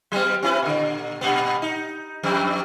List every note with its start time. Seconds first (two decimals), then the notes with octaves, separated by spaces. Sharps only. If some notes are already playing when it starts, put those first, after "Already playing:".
0.12 F#3 G3 B3
0.43 C4 E4 B4
0.62 A#2 D3
1.21 G2 A#2 B3
1.62 D#4
2.23 F2 G3